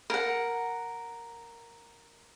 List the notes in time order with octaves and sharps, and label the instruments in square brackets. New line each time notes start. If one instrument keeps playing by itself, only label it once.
[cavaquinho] A#4 F#5